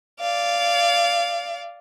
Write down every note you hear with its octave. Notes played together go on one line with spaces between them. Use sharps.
D5 F5